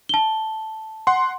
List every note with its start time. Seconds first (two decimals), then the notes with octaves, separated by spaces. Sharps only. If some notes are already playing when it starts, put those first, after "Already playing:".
0.09 A5 G7
1.07 F#5 C6